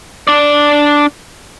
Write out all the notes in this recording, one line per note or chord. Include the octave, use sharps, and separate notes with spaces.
D4 D5